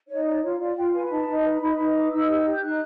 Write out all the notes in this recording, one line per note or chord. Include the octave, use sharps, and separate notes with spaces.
D#4 C#5
C#5 D5
F4 C#5
F4 D5
F4 G5
B4 G#5
G#5
D#4 A5
D#4
B4
A#5
D#4 B5
D#4
B4 D6
D#4 E6
G4
G4
G6
D#4 F#6